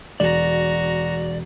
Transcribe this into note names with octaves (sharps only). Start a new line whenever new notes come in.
E1 F#4 D5 A#5